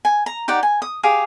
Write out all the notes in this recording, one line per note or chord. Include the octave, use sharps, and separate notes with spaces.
G#5
A#5
D#4 G4 D5 F#5
G#5
D#6
G4 G#4 F5